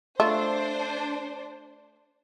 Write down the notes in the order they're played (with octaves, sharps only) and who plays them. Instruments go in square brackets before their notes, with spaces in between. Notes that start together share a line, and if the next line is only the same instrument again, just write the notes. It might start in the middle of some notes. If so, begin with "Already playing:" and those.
[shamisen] A3 F4 E5 [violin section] D4 C5